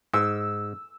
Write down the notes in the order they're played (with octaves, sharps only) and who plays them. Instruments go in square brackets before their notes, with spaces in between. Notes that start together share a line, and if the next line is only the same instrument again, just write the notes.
[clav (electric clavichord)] G#2 [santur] E6